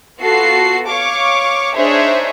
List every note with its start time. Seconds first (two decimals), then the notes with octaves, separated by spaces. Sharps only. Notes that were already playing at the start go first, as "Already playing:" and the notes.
0.20 B3 F4 F#4 A4 C7
0.88 C#5 F5 C#6 D6
1.74 D4 D#4 G#4 C5 C#5 E5